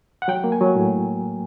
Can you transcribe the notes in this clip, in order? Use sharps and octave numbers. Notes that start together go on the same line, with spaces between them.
F#5
F#3 G5
A#3
G#5
F#3
A2